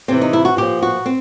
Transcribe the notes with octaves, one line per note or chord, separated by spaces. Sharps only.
C3 E3 C4
D#4
E4
F#4
A#2 F3 G4
F#4
C4